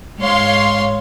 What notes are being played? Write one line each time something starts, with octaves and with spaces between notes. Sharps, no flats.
G#2 C#5 F5 C6